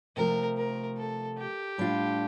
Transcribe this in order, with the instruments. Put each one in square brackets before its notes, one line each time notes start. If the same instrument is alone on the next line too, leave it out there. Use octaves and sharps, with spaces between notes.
[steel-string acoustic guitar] C3 F3 A3 [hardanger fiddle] A#4
[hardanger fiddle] A#4
A4
G4
[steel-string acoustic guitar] A2 G3 D4 F4